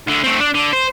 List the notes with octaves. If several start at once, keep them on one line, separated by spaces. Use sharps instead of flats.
D2 D3
A3 C4
D4
D3
C5